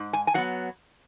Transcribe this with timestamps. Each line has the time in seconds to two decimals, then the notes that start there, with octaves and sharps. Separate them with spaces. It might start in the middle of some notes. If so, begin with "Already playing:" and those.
Already playing: G#2
0.13 G#5
0.27 G#5
0.34 F#3 F#5
0.38 B3